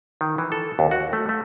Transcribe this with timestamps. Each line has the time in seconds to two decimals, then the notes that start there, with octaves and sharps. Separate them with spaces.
0.21 D#3
0.38 E3
0.52 A4
0.79 D#2
0.91 F#4
1.13 A3
1.29 A3